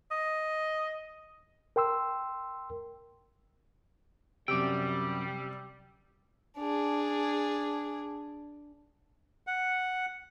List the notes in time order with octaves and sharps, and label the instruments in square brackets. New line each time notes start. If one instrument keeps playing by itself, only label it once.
[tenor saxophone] D#5
[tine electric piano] A#4 G5 C6 E6
[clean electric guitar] F#2 G5 [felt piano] C3 [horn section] G3 [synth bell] D6 E6
[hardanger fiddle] D4 G#4
[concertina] F#5